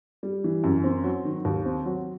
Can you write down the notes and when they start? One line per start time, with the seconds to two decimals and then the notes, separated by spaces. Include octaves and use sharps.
0.23 G3
0.44 E3
0.64 F#2
0.84 C4
1.04 F#3
1.25 D#3
1.45 D#2
1.65 C4
1.86 F#3